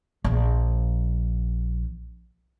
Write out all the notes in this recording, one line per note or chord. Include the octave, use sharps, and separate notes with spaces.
A#1 F3